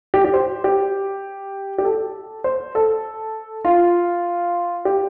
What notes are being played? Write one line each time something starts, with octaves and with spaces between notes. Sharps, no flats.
G4
G4
C5
G4
G4
A4
C5
A4
F4
G4